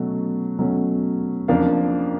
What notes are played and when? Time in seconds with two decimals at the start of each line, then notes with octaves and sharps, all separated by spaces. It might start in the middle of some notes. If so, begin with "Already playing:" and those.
Already playing: B2 F#3 A3 C#4
0.58 B2 F#3 A3 C#4
1.48 F2 C#3 F3 A#3 D4 F5